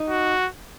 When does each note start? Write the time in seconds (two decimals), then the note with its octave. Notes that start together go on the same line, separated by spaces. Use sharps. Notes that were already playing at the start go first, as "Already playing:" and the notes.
Already playing: D#4
0.09 F#4